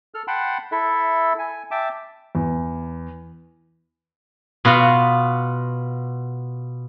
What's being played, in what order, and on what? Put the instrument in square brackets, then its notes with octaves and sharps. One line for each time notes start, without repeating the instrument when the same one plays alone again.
[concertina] A4 F6
F#5 G5 A5 B5 C6
E4 A4 E5
G#5
E5 G5 A5 D6
[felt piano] E2
[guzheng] B2 B3 F4 F#4